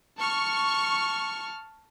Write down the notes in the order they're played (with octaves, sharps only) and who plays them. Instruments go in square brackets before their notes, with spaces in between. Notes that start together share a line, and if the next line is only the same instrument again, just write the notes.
[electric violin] A5 F6 [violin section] C#6